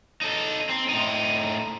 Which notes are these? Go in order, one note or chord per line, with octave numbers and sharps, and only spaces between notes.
D#4 A4
C4
A2 D#4